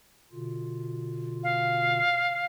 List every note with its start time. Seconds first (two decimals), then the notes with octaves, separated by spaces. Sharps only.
0.32 B2 D3 F4
1.43 F5